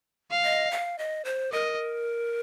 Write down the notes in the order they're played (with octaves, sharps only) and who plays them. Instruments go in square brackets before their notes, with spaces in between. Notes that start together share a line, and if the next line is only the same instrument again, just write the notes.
[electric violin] F5
[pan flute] D#5
F5
D#5
C5
[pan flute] A#4 [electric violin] D#5